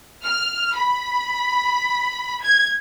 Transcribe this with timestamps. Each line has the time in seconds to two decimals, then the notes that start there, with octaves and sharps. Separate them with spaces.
0.24 F6
0.73 B5
2.42 G#6